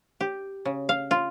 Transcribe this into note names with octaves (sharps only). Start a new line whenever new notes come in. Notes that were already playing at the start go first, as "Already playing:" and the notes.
G4
C#3
F5
F4